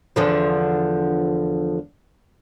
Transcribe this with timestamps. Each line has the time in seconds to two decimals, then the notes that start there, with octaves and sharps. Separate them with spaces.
0.16 E2 D3 F3